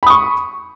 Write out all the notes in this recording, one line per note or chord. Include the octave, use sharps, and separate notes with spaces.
B5 C#6 D#6